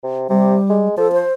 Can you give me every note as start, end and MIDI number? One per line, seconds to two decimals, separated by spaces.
0.03 0.30 48
0.30 0.57 48
0.30 0.88 55
0.70 0.95 56
0.98 1.23 53
0.98 1.11 69
1.13 1.33 72